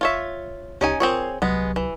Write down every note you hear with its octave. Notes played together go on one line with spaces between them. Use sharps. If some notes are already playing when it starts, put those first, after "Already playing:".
F4 C#5 E5
C2 C#4 D#4 G4 G#5
C4 F4 G#4 A#4 C#5
C2 F#3 G#3 B3
E3